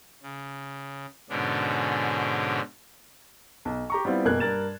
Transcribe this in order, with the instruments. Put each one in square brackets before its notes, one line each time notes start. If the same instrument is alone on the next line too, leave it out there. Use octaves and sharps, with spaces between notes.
[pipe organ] C#3
G#2 B2 D3 C#4 D4
[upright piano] B1
G4 A#5 C#6
G3 B3 C4 E4 F4
F#1 B2 A#3 F#6 G#6 F#7
G2 A#4 A6 E7